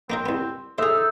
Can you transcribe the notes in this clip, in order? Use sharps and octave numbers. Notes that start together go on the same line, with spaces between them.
A#3 C4 D#4 A#4
C2 B3
D#4 G#4 A4 C5 E5 F6